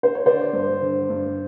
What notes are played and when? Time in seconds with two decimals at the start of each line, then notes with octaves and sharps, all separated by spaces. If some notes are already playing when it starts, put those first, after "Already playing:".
0.03 C5
0.15 C#5
0.25 D3 C5 D5
0.53 G2
0.82 D3
1.10 G2